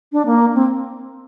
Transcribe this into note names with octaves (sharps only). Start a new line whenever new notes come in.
D4
A#3
C4